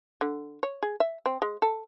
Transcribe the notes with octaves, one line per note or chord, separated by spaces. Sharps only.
D3
C#5
G#4
E5
C4
G#3
A4